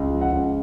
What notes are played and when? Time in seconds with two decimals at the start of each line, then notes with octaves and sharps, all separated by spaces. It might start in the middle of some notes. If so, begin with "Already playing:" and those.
Already playing: C#2
0.10 F3
0.21 F#5
0.32 C#2